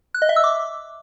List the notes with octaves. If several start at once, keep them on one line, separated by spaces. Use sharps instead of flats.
F#6
D#5
E5
E6
D6